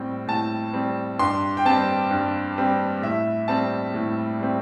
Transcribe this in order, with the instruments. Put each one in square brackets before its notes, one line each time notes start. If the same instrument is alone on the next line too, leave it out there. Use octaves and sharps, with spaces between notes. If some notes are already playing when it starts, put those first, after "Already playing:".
Already playing: [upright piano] A2 G3 C4 G5
A2 A5
G3 C4
G2 C6
G5
G3 C4 A5
G2
G3 C4
A2 E5
G3 C4 A5
A2
G3 C4